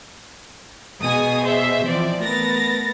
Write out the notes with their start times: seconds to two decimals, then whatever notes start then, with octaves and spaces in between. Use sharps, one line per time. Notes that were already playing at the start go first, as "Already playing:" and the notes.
1.01 B2 G#4 G#5 D#6
1.44 C5 E5
1.85 E3 F3 C4 D5
2.21 A3 B3 A#4 A6 A#6